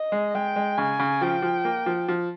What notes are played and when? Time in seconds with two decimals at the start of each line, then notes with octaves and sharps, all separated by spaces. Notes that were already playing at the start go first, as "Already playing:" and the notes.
Already playing: D#5
0.12 G#3
0.35 G#3 G5
0.56 G#3
0.77 C#3 G#5
0.99 C#3
1.21 F3 G5
1.42 F3
1.65 A#3
1.86 F3
2.08 F3